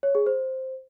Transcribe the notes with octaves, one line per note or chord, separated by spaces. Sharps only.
C#5
G#4
C5